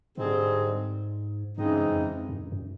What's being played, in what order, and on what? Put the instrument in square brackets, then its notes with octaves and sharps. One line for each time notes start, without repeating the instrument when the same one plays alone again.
[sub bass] G#2 [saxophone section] D3 G3 C4 D#4 G#4
[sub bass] G2 [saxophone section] C#3 E3 G#3 C4 D#4
[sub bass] F#2
F2
G2
F#2
F#2